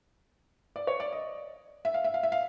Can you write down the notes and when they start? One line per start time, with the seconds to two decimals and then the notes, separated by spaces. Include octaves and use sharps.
0.76 D5
0.87 C#5
1.00 D5
1.12 D#5
1.85 E5
1.94 F5
2.04 E5
2.14 F5
2.23 E5
2.32 F5